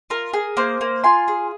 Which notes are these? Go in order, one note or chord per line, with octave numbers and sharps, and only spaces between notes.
F4 A#4
G#4
A#3 C5
A#3
F4 G#5 C6
G#4